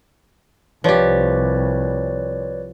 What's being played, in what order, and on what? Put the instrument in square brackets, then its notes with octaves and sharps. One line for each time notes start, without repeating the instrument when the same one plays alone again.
[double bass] C2 [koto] F3 G4 [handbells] B4 C#5 D5